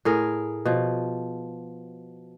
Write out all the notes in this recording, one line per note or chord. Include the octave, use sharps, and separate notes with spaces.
A2 G#4 A#4
B2 F3